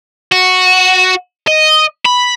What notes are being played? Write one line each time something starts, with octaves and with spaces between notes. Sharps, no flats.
F#4
D#5
B5